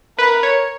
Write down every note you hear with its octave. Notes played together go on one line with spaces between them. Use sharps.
A#4 B4
C#5